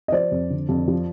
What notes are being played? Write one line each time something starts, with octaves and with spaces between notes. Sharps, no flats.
D#5
F3 C5 D5
F2
D3
F2
F3